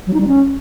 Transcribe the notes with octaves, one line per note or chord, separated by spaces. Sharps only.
F#3
D#4
G3
C#4